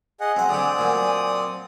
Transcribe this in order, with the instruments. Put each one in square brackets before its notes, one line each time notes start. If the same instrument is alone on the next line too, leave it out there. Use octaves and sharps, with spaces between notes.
[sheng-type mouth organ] G#4 D#5 F#5 [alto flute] G#5
[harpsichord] F#3 F#5 [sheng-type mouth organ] C4
[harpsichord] D3 G4 [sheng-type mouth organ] C4 D5 D#6
[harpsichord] A#2 F#3